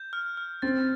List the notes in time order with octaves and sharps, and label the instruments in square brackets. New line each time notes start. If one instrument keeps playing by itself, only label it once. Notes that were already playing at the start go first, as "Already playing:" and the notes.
Already playing: [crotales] G6
F6
F6
[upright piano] C4 [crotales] A6